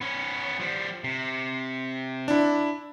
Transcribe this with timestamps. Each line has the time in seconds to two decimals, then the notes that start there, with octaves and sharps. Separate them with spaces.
0.01 B3 C#4
0.60 F3 G3
1.04 C3
2.28 D4 E4